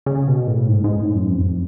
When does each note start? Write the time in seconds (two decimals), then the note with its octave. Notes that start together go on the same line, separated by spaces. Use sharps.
0.06 C#3
0.27 B2
0.47 A2
0.68 G#2
0.84 G#2
1.00 A2
1.15 F#2
1.31 F2